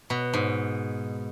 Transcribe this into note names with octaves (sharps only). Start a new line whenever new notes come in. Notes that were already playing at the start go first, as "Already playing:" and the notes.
B2
G#2